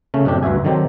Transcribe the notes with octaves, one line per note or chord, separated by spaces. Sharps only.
C#3 A3 C#4
F#2 A2 C3 D4 G4
D2 G2 F#4 E5 G#5
D3 D#3 F#3 C4 G4